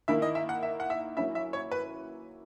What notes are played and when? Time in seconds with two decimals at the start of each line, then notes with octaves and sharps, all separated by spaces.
0.08 D#3 A#3 E4 E5
0.22 D#5
0.35 E5
0.49 F#5
0.63 E5
0.80 F#5
0.90 E5
1.17 F#3 A#3 C#4 E4 E5
1.35 E5
1.53 C#5
1.71 B4